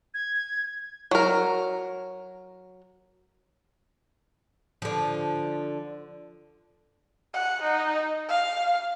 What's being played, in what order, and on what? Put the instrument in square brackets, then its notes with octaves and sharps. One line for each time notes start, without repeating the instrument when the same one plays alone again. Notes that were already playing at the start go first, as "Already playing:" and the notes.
[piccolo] G#6
[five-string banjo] F#3 A#4
[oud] D3 F3
[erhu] F#5
D#4
F5